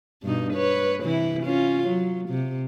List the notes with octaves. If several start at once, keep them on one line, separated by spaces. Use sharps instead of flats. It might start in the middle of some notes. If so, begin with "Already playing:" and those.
G2 B2 D#4
B4 C#5
C3 E3 E4
C#4 F4
F#3
C3